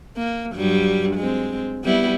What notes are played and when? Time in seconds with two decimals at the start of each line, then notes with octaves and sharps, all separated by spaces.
0.17 A#3
0.54 G2 F#3 G3
1.15 G#3 C4
1.84 G3 B3 E4